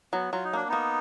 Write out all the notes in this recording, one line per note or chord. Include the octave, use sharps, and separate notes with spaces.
F#3 B3
F#3 F4
D#4
A#3 D4
A#3 B3 D#4